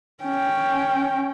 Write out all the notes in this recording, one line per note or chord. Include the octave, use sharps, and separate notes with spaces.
C#4 G5